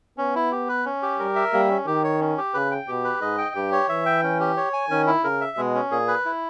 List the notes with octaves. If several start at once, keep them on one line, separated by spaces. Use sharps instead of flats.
B3 C#4
E4
G4
B4
C#4
G4
G3 A#4
E5
G3 A#3
C#4
D#3 G4
C#5
C#4
G4
C#3 B4
G5
B2 G4
B4
G#2 D#5
G5
G2 G4
C#5
E3 E5
G5
C#4
G4
C#5
G#5
D#3 C#4
E4
C#3 A#4
E5
B2 G#3
C#4
A#2 G#4
B4
E4